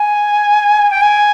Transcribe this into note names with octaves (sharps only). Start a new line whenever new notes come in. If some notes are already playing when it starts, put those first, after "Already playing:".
Already playing: G#5
G5
G#5